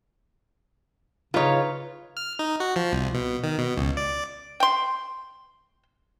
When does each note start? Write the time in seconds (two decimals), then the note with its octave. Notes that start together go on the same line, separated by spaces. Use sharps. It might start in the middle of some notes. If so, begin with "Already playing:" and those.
1.34 C#3 D#4 F4 B4 C#5
2.17 F6
2.39 D#4
2.60 F#4
2.76 F3
2.93 C2
3.14 B2
3.44 D#3
3.58 B2
3.77 C#2
3.97 D5
4.60 G5 C6